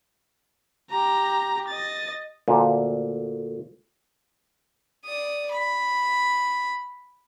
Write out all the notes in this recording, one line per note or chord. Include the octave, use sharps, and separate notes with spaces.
G4 A#5
D#5 A6
D2 A#2
D5 D#6
B5